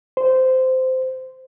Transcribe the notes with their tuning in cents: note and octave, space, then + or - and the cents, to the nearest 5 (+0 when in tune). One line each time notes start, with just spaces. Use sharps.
C5 -15